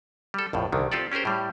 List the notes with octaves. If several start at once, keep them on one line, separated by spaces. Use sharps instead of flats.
G3 A4
A#1 F2 A2
C2 D3 D#3
C4 F4 G4 A4 D5
C#4 G4 G#4 A#4 C5
A2 G3